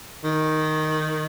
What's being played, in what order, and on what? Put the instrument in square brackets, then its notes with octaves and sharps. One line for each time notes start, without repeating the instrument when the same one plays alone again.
[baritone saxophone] D#3